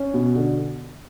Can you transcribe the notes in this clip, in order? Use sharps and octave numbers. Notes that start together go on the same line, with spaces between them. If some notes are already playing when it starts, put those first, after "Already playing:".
Already playing: C#4
B2
D3